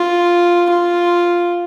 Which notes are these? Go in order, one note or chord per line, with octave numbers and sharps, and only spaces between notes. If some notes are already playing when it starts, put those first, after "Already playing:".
Already playing: F4
F4